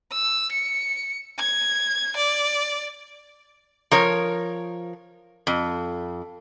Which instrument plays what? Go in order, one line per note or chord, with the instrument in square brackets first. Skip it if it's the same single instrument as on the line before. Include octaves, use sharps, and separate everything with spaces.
[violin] E6
C#7
G#6
D5
[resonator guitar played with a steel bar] F3 A#4 C#5
F2